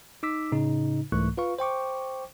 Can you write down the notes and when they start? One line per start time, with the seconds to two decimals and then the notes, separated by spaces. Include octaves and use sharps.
0.23 D#4 D6 E6 B6
0.52 A2 C#3 D#4
1.12 C2 G#2 E3 A3 C#6 F#6
1.37 F4 B4 F5 C#6
1.59 C5 G5 C#6 D6